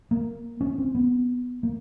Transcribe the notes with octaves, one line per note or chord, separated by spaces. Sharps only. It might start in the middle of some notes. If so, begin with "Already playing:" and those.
A#3
C#4
C4
B3
A#3